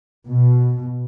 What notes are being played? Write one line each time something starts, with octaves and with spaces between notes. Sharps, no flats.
B2